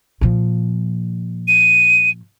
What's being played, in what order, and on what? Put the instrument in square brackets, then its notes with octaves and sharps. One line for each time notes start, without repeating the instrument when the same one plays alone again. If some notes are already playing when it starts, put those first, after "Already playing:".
[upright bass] A#2 F3
[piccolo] D#7